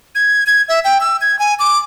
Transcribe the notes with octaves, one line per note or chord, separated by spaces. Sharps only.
G#6
G#6
E5
G5
E6
G#6
G#5
D6